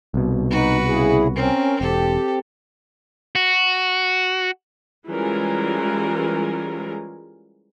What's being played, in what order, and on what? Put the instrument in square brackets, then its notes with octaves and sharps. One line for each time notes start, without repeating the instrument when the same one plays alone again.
[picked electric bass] C2 B2
[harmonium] D#4 [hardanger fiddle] F#4 B4
[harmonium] C#3 E4 G#4
[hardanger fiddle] C4 [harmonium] C#4 A#4
[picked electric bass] E1 [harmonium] C4 G4 [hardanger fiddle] A4
[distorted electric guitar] F#4
[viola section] E3 G3 G#3 C#4 F4 A#4